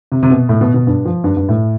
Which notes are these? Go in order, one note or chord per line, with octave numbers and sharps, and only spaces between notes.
C3
C3
B2
A2
B2
B2
G2
F3
G2
G2
A2